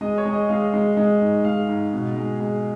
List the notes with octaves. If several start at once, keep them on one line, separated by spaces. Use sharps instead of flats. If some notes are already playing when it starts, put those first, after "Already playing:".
G#3 D#5
C#5
G#3
D#5
G#3 F5
G#3
G#3
G#2
G#3 F5
G#2
B2
G#3
G#3